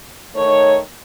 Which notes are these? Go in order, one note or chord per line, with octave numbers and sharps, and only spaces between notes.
D#3 A3 D#4 C#5